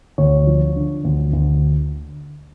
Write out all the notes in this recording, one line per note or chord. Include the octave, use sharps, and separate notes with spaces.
D2 C#5
F3
D3
D2
D2